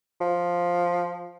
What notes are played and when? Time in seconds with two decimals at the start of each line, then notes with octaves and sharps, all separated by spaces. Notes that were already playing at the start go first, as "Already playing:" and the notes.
0.21 F3